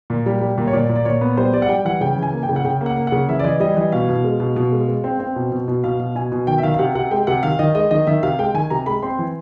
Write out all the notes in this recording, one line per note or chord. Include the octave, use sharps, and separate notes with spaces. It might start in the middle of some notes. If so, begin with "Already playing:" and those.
A#2
G3
G3
A#2
C#5
A#2 D5
A#2
D5
A#2 C#5
B3
G3 C5
G3 D5
F#5
G3 G5
E3 F#5
C#3 G5
E3
G#5
A#3
G5
C#3
F#5
C#3 G5
A#3
F#5
A#3
C#3 F#5
E3 E5
D5
E3 D#5
G3 D#5
E3 D#5
B2 F5
B2
G#3
B2
B2
G#3
G#3
C4
C4
B2
B2
B2
B2 F5
B2
B2 G#5
B2
D#3 G5
E5
D#3 F5
F5
C3 F#5
C3 F#5
G#3 G5
C3 F#5
D#3 F5
D#3 D#5
G#3 D#5
D#3 D#5
D#3 E5
C3 F5
G#3 G5
D#3 G#5
C3 A#5
G#3 B5
C4 C6
E3